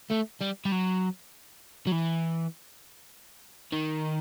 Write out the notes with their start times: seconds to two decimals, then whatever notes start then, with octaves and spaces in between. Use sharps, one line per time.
0.11 A3
0.41 G3
0.65 G3
0.72 F#3
1.87 F#3
1.92 E3
3.72 D#3